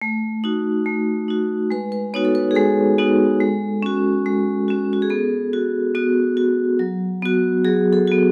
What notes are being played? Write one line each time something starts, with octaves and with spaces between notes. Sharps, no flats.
A3
D#4 F#4
A3
D#4 F#4
G#3 B4
B4
B3 D#4 F#4 C#5
A4
B4
G#4
G#3 A4
B3 D#4 F#4
G#3
C#4 F#4
G#3
C#4 F#4
F#4
G#4
B3 A4
F#4
B3 F#4
F#4
F#3
B3 F#4
F#3 G#4
A4
B3 F#4